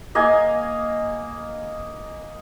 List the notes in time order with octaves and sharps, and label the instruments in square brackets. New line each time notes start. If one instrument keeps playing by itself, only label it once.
[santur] A#3 D#5 F5 G#5